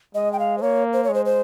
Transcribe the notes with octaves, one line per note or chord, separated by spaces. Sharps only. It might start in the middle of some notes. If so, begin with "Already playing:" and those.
G#3 D#5
G5
F5
C5
A#3 C#5
C5
C#5
G#3 C5
C5